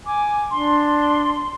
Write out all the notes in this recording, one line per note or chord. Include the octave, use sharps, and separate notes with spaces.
G#5 D6
D4 C6